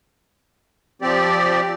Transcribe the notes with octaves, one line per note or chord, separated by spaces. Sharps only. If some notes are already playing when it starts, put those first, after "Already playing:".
F3 C4 G4 D5